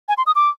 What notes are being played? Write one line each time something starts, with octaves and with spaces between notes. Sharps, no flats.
G#5
C6
D#6
D6